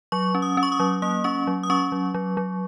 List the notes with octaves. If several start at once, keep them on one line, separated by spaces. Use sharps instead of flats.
F#3 C#6
C#4
D#6
C#4
C#6
D#6
F#3
A#3 D#6
C#4 C#6
F#3
D#6
C#4 C#6
F#3
F#3
F#3